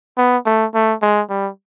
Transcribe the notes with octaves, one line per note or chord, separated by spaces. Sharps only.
B3
A3
A3
G#3
G3